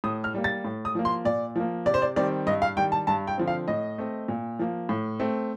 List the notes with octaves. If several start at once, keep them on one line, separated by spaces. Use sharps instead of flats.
A2 D#6
F6
G3 A#3
A6
A2
D#6
F3 A#3
C6
A#2 D5
F3 A#3
C3 D5
C5
D5
D#3 G3 C4 D5
G2 D#5
F5
D#3 G3 G5
A5
G2 A5
G5
D3 F3 C4
F5
A2 D#5
A3 C4
A#2
F3 A#3
A2
A3 C4